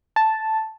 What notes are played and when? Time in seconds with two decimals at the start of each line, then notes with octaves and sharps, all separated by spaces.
0.16 A5